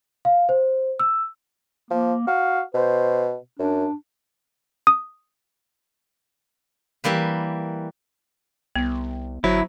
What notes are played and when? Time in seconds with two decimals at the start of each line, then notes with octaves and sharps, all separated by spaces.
0.25 F5
0.49 C5
1.00 E6
1.91 F3 A#3
2.27 F#4 F5
2.74 B2 C5
3.59 F#2 D4
4.87 D#6
7.04 E3 G3 A#3 B4
8.76 C2 B3
9.44 G1 F#3 E4 C5